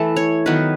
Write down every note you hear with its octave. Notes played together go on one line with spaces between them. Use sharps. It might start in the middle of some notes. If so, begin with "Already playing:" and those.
Already playing: E3 A3 A4
C#5
D#3 F#3 B3 B4